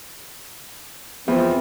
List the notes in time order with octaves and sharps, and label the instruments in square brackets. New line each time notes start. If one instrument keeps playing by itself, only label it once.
[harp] E2 [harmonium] F3 C4